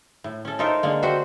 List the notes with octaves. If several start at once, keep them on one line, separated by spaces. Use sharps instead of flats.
A2
C#4 A4
D#4 F4 A4 A#4 C5 E5
D3 G#3 A#3
F#4 G4 C5 E5